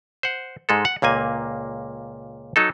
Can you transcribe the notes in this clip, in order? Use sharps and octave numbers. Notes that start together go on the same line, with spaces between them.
C5 F#5
G#2 G#3 A4
F#5
C#2 A#2 A#3 G#5
F#3 D#4 A4